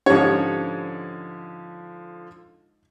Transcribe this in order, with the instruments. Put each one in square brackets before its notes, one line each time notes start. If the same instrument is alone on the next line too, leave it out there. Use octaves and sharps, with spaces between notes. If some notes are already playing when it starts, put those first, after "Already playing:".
[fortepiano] G#2 C#5 [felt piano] D3 F3 [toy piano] C#4 G4 F#5